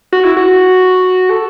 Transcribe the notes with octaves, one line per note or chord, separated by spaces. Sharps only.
F#4
E4
F#4
A4